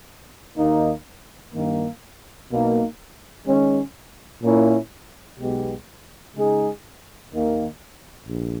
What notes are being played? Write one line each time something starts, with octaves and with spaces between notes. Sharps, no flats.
D#2 D#3 A#3 D#4
G2 D#3 A#3
B1 B2 A#3 D#4
D#3 G#3 C#4
A#2 A#3 C#4 E4
B1 B2 G#3 B3 G4
C#3 G#3 D#4 G#4
D#2 D#3 A#3
A#1